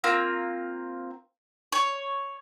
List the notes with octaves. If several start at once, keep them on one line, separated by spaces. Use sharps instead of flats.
A#3 C4 F4
C#5